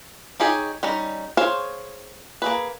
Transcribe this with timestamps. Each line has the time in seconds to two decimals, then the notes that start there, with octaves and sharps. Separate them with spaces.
0.40 D#4 G4 G#4 C#5 G#5
0.83 G3 C#4 D#4
1.37 G#4 C5 C#5 F5
2.42 A#3 G#4 B4